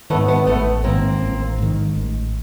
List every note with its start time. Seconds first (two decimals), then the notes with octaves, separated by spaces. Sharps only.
0.10 D#3 A3 B3
0.15 G#2
0.28 A3 B3
0.47 A1 A3 B3
0.84 G#2 D#3 A#3 C4
1.21 A1
1.58 G#2 D#3
1.96 A1